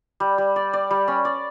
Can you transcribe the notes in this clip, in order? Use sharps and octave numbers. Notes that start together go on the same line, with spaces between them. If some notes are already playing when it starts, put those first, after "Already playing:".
G3
G3
D5
D5
G3
C#4
D5